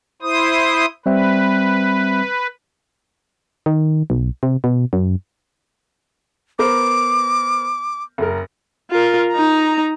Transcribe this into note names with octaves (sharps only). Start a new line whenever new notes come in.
E4 C5 D#6
G3 C4 B4 E5
D#3
B1
C3
B2
F#2
B3 A#4 C5 D6
F#1 A#4
F4 A#4
D#4 A#5